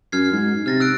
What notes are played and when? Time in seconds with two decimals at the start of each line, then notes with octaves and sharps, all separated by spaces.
0.12 F#2 F6 G#6 C7
0.32 G#2
0.66 C3 F6 A6 A#6
0.80 E6 F#6 D7